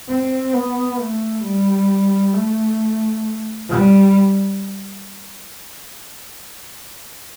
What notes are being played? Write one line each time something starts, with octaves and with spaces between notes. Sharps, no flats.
C4
B3
A3
G3
A3
G3